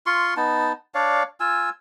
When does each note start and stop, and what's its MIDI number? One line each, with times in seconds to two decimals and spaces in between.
0.06 0.34 65
0.06 0.34 84
0.06 0.34 85
0.37 0.73 59
0.37 0.73 63
0.37 0.73 81
0.95 1.23 62
0.95 1.23 73
0.95 1.23 74
0.95 1.23 77
1.40 1.70 65
1.40 1.70 80
1.40 1.70 88